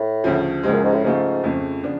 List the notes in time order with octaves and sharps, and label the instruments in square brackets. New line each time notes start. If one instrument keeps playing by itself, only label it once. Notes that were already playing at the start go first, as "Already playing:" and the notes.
Already playing: [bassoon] A2
[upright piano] D2 C#3 F3
[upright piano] C#2 C#3 F3 G#3 [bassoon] G#2
[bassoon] F#2
G#2
A2
[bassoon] G#2 [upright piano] C#3 F3 A3 F4
[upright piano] F2 C#3 F3 A3
C#3 F3 B3 D4